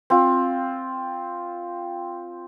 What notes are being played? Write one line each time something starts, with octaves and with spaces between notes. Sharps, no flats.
C4 F4